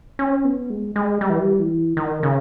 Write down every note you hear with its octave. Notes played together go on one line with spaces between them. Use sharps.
C#4
B3
G#3
G#3
G3
E3
G3
E3
D#3
C#3